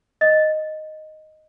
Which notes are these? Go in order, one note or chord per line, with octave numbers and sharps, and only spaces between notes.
D#5